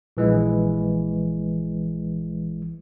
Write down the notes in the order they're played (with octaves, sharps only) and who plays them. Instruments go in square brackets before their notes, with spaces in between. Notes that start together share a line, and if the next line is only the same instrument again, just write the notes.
[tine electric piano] A#1 E3 G#3